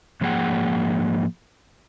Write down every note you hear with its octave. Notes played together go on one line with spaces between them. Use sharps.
G#2 F3 A#3 G#4 F#5 G5